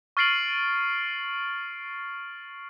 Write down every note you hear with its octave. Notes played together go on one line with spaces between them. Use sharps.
C#6 F6 A6 C7 D7 F#7